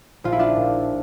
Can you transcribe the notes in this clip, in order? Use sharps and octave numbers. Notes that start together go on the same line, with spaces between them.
A#1 F4
E4
D4 F4
A#2